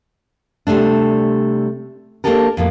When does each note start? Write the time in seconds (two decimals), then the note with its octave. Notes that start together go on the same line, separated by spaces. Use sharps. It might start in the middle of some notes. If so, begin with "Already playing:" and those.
0.67 C3 G3 A3 D4
2.24 A#3 B3 D4 G4 A4 A#4
2.57 F2 A2 A#3